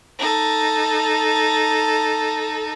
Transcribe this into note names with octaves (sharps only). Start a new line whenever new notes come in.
D#4 A4